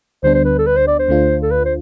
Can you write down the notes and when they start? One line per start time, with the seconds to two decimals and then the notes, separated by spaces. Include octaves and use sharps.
0.23 D2 D3 G3 B3 D4 C5
0.35 C5
0.45 B4
0.58 A4
0.67 B4
0.77 C5
0.87 D5
0.99 C5
1.09 D2 D3 A3 D4 F4
1.42 A4
1.51 B4
1.65 C5